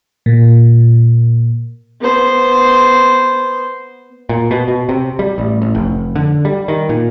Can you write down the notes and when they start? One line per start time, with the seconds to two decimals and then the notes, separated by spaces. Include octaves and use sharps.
0.26 A#2
2.00 B3 C5
4.29 A#2
4.51 B2
4.68 B2
4.89 C3
5.19 G3
5.38 A1
5.62 A1
5.75 F1
6.16 D3
6.45 G3
6.68 D#3
6.89 A#2